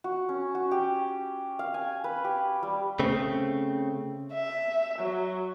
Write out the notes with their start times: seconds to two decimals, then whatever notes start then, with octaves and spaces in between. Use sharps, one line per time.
0.04 F#4
0.29 C#4
0.55 F#4
0.71 G4
1.59 F5
1.74 G#5
2.04 B4
2.24 G4
2.63 G3
3.00 C#3 A3 C4
4.33 E5
4.99 F#3